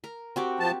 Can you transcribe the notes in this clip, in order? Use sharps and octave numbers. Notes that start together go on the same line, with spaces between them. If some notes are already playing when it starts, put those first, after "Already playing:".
A#4
C4 F#4 G4
F3 A5